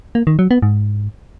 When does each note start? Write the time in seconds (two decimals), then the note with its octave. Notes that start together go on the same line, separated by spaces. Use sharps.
0.15 A#3
0.27 D#3
0.39 F#3
0.51 B3
0.62 G#2